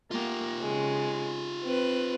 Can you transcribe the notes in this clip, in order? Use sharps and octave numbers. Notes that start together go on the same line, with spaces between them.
A#3 F4 G4
C#3 G#3
C4 B4